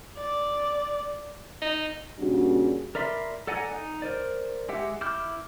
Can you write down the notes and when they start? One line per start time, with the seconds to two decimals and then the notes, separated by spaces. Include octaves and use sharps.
0.17 D5
1.62 D#4
2.18 A#2 C#3 G3 D4 F#4
2.95 A#4 D5 E5 B5 C6
3.47 A4 D5 F#5 G#5 A#5
3.71 D#4
4.02 A#4 C5 D5
4.69 G#3 G4 E5 F#5
5.01 E4 D6 F6 G6